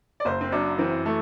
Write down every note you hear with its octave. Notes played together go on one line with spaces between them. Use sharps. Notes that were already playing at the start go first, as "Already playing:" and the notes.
D5
F#1 C5
C4
F#2 D4
E3 C4
A3